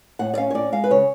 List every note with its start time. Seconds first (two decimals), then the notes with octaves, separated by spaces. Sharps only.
0.19 A2 F#5
0.34 D5
0.38 C#4 F5
0.50 C#5
0.54 A2 D5
0.72 G#3 F5
0.84 B4
0.90 C#3 C#5